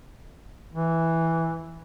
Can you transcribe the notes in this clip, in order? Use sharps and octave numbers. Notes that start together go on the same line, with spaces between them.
E3